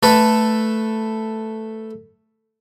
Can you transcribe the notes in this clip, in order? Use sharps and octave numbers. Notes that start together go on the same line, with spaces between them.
A3 A4 B4